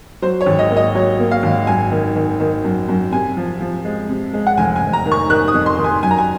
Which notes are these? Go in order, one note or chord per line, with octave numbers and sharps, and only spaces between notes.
F#3 C5
C#5
G#1
D#5
A#3
D#5
F#3 C#5
A#3
F5
G#1
F#2 G#5
D#3
D#3
D#3
F#2
F#2
C3 G#5
F3
F3
G#3
C3
G#3
F#5
F1 G#5
G#5
F1
A#5
D#3
C#6
D#3 F#6
D#6
F2
C6
D#3
G#5
F#2 G#5
A#5
G#5